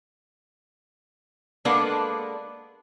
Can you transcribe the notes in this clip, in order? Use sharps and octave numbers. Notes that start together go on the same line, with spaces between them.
G#3 A#3 B3 D4 A4 B4